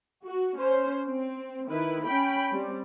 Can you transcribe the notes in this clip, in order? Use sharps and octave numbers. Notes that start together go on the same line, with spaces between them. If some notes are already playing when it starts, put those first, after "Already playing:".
F#4
C#4 C5
C4
D#3 E4 B4
C#4 G5 B5
G3 C4